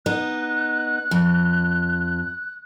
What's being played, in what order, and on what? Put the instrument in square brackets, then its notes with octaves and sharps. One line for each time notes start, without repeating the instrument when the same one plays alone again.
[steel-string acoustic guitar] B3 D#4 [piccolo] F#6
[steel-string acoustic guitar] F2